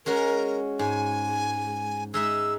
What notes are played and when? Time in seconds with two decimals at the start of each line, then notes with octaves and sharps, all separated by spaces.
0.06 G#3 C#4 F#4 A#4
0.79 G#2 G#5
2.14 G#3 D#4 E5 E6